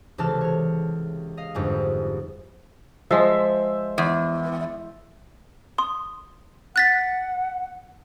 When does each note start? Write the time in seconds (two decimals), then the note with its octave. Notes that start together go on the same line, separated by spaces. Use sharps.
0.18 C#2 C3 E3 A4 A5 F6
0.41 C#5 F6
1.37 D#5 F5
1.54 G1 F2 G#2 G#3
3.11 F3 G#3 C5 E5
3.98 E2
5.78 C6 D#6
6.76 F#5 F#6 A6 B6